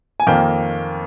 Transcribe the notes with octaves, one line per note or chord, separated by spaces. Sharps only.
G#5
F2 D#3 A#3 G5